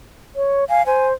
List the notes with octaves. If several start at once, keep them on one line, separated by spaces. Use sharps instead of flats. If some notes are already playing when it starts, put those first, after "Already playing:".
C#5
F5 G#5
C5 G#5